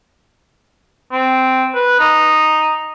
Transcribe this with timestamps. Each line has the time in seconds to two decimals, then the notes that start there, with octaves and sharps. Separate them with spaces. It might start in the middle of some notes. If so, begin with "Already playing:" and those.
1.12 C4
1.74 B4
1.99 D#4